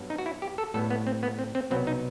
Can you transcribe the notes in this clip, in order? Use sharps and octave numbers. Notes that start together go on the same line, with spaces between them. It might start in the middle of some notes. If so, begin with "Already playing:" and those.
Already playing: G2 F#3 B3
D#4
F#4
E4
G4
A4
A2 G3 B3 A4
B3
C4
B3
C4
C4
C2 B2 F#3 B3 C4
D#4